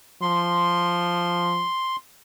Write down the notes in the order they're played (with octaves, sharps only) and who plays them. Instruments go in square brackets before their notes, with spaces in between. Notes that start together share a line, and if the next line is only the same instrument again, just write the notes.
[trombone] F3 [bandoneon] C6